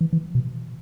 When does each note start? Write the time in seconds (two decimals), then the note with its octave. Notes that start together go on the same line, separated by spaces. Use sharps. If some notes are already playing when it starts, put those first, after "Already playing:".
0.01 E3
0.13 E3
0.35 B2